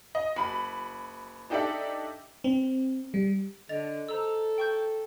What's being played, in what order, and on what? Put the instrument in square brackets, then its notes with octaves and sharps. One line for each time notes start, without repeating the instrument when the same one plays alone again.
[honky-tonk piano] D#5
F#1 B5
D4 D#4 G4 A4 D5 E5
[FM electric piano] C4
G3
[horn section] D3 [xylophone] D#5 A6 F7
[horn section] A4 [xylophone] C5 A#5 E6
[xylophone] G5 C#6 G6